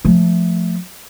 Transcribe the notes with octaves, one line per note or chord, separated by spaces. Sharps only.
F3 A3